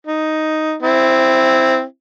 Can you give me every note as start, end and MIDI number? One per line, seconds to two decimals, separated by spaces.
0.06 0.76 63
0.82 1.83 60
0.82 1.83 64